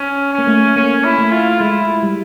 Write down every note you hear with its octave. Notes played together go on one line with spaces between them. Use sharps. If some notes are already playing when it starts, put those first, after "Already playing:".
Already playing: C#4
C#4
A#3
A3
A#3 C#4
E4
A3
F4
G#3 E4
G3